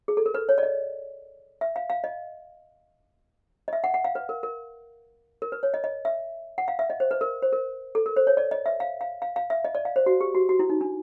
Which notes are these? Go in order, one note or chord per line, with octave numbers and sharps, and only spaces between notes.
G#4
A4
A#4
B4
C#5
D5
D#5
E5
F5
F5
D#5
D#5
E5
F#5
F#5
F5
B4
A#4
A#4
A#4
B4
C#5
D#5
D#5
E5
F#5
F5
E5
D#5
C5
B4
A#4
C5
A#4
A4
A#4
C5
C#5
D5
D#5
E5
F5
F5
F5
F5
E5
D#5
D5
F5
C5
F#4
G4
F#4
F#4
E4
D#4
D4